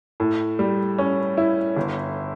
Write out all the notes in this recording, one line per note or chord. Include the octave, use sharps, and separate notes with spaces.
A2
G3
C#4
E4
G1